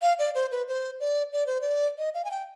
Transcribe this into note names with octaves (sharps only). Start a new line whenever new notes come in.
F5
D5
C5
B4
C5
D5
D5
C5
D5
D#5
F5
G#5
G5